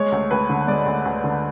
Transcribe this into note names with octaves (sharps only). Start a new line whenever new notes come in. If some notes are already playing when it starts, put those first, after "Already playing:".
Already playing: G#3 C#5
D2
D2 B4
D3
G#3 D5
D2
D2
D3